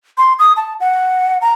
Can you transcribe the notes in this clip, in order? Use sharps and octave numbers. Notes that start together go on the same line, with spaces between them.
C6
D#6
A5
F#5
A#5